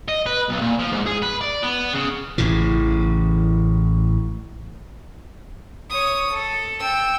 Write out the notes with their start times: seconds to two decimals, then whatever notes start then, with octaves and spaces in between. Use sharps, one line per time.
0.09 D#5
0.26 B4
0.49 B1
0.61 A#2
0.79 F3
0.92 G#2
1.06 G#4
1.22 B4
1.41 D5
1.63 B3
1.94 C#3
2.38 A1 A2 C#3 E3
5.90 C#5 D#6
6.32 A4
6.80 G5 E6